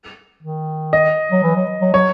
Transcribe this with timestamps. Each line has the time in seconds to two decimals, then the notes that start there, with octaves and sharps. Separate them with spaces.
0.43 D#3
0.93 D#5
1.31 F#3
1.43 E3
1.56 F#3
1.81 F#3
1.94 F#3 C#5